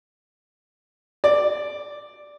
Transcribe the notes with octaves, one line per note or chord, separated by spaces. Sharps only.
D5